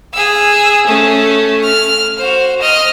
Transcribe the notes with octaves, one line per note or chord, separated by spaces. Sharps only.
G#4 E6
A3 C#4
F6
F#4 C5
D#5 F6